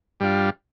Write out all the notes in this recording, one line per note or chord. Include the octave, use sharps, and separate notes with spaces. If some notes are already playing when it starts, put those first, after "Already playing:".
G2 G3 D4 F4